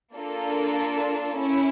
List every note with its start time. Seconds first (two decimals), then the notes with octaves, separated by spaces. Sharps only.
0.14 A#3 D4 F4 A4
1.38 C#4 E4